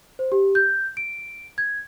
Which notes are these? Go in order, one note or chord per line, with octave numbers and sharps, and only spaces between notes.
C5
G4
G6
D7
G#6